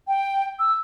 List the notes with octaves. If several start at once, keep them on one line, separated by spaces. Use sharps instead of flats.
G5
E6